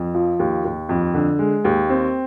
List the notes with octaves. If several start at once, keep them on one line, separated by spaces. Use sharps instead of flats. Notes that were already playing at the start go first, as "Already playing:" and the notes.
Already playing: F2
F3
D#2
D#2
F2
D3
G#3
D#2
C4